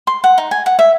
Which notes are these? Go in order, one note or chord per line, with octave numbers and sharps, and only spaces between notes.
C6
F#5
D#4
G#5
F#5
E5